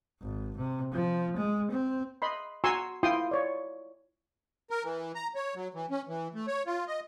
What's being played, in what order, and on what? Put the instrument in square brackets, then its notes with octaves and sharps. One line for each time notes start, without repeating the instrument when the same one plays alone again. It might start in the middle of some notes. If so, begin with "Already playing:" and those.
[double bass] G#1
C3
F3
G#3
C4
[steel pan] D#5 B5 C6
F#4 G#5 A#5 C6 C#6 E6
E4 F4 G5 C6 D#6
C#5 D5
[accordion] A#4
E3
A#5
C#5
F#3
E3
C#4
E3
A3
C#5
F4
D#5